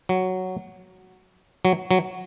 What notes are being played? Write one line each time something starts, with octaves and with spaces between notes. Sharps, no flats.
F#3
F#3
F#3